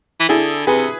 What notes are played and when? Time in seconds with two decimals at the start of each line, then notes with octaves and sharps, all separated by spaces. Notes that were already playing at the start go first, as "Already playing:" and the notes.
0.20 E3
0.28 D3 E4 G#4
0.67 C3 G#4 B4